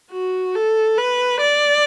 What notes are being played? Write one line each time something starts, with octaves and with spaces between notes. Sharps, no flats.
F#4
A4
B4
D5